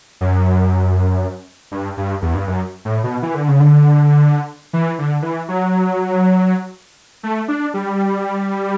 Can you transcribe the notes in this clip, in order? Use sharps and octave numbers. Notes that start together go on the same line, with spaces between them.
F#2
G2
G2
E2
G2
F#2
A2
B2
E3
D3
C#3
D3
E3
D3
E3
F#3
A3
D4
G3